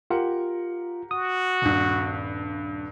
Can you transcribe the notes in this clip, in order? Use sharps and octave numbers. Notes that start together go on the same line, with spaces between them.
F4 G4 A#4 F#5
F#4 D#6
D#1 G2